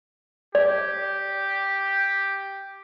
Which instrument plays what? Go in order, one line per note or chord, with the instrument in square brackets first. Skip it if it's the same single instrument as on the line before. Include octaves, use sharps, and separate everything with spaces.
[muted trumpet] G4 [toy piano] D5